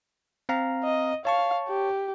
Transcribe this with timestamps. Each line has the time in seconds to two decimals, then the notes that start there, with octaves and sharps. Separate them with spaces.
0.49 C4 F5 A#5
0.84 D#5
1.25 C#5 F5 A5 C#6
1.68 G4